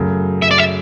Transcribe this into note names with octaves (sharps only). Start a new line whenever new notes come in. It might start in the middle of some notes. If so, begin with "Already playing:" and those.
Already playing: F#2 C#3 F#3 A3
E5
D5
E5